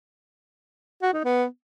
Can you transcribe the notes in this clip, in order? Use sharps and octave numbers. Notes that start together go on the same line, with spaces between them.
F#4
D#4
B3